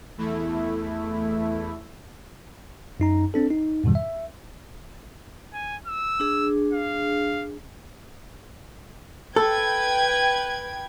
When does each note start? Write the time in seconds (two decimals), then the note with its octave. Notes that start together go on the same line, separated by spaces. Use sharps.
0.18 E2 A3 E4
3.00 F#2 D#4 A#5
3.34 C4 D4 A4
3.51 D#4
3.84 F2 G#2 B2 D#3 G3
3.95 E5
5.54 G#5
5.87 E6
6.20 D4 G#4
6.72 F5
9.36 A4 B4 G5 G#6